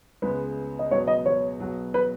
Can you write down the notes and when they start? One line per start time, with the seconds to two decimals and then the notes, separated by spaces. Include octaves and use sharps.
0.22 C#2 C#3 G#3 B3 B4
0.79 D#5
0.91 C#2 B2 F#3 B3 C#5
1.07 D#5
1.26 C#5
1.60 B1 B2 F#3 B3 F#4
1.94 B4